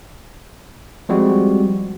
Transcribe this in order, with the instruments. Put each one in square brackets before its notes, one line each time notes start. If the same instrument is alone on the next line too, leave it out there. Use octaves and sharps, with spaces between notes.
[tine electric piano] F3 G3 G#3 C4 F#4